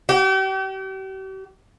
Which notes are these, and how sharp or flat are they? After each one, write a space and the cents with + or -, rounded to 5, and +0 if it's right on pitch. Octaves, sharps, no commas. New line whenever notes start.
G4 -40